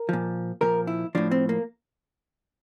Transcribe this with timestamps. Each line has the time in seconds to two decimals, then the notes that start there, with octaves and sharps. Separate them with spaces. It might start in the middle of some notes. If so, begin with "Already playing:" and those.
Already playing: A#4
0.09 A#2 F3
0.61 A#2 F3 A#4
0.87 E4
1.15 A2 F3 D4
1.31 C4
1.49 A#3